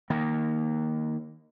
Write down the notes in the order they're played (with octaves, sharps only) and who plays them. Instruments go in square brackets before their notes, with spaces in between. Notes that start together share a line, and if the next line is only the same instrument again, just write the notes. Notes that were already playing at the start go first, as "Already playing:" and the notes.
[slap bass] D#3 A#3